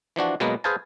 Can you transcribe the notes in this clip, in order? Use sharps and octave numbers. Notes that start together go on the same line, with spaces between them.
E3 F3 D4 F#4
B2 F#3 G#3 A#3 B3 B4
G#4 B4 C5 F5 G#5 A5